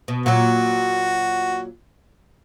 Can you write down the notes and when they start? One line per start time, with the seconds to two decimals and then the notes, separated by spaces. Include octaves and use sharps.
0.08 B2
0.26 A#2 F#3 F#4